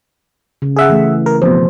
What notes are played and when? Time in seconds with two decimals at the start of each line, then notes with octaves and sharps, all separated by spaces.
0.62 C#3
0.76 G#4 E5 F#5
0.89 E3 A3
1.26 A#4
1.42 F2 B2 C5